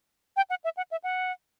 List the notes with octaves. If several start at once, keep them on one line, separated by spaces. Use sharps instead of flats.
G5
F#5
E5
F#5
E5
F#5